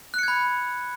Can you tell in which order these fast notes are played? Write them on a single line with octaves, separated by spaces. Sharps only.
F#6 C#7 G#6 B5